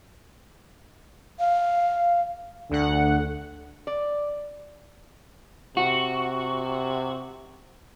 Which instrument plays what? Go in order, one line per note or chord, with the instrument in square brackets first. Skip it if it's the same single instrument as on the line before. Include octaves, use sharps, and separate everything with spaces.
[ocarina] F5
[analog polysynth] D2 F#5 [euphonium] D3
[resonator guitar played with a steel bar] D5
[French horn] C3 [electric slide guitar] F#4